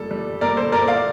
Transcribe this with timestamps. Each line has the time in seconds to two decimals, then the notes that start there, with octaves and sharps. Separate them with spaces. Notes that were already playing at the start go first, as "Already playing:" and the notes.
Already playing: A#2 G3 A4
0.11 G3
0.41 A#2 A#4 D5
0.57 A4 C5
0.72 A#2 A#4 D5
0.88 D5 F5